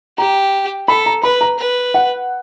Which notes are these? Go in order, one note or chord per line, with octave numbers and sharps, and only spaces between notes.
G4 A#5
A4 B5
A#5
B4 B5
A#5
B4
F#5